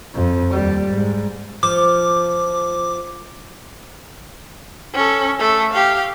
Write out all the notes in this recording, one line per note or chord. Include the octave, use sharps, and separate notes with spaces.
F2
D#2 G3
G#2
F3 D6
C#4 A4
A3 A4
G4 F5